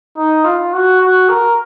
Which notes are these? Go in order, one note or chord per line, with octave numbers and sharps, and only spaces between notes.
D#4
F4
F#4
F#4
A#4